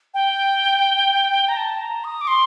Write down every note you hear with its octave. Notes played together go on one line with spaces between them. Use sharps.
G5
A#5
A5
A#5
D#6
D6
C6